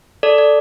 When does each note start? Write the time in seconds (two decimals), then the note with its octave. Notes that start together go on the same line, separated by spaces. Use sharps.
0.23 A4 D5
0.38 D5